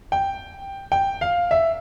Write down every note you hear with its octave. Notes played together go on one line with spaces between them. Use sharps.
G5
G5
F5
E5